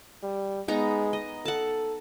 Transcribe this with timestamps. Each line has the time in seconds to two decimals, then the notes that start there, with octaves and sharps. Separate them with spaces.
0.23 G3
0.68 G#3 B3 D#4 A#5
1.13 D#5
1.45 A4 F#5 A5